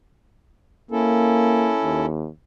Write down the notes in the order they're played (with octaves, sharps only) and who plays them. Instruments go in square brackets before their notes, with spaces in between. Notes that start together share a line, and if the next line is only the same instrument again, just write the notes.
[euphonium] A#3 [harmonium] C#4 E4 A4
[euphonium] D#2